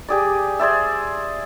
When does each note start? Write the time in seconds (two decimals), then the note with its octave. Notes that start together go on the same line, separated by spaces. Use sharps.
0.08 G4 G#4 D5
0.59 G#4 C5 D5 E5